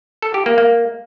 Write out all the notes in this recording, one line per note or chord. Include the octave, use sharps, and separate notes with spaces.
A4
G4
A#3
A#3